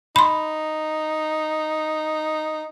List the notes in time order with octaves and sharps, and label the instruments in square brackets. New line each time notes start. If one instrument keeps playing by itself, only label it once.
[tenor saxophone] D#4 [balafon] B5 C6